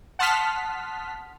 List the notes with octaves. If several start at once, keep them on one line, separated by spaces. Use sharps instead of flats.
F#5 A5 C6 D#6 F6 B6